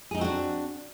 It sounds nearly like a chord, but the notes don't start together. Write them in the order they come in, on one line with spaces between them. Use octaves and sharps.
G#4 D#4 C4 F#4 D4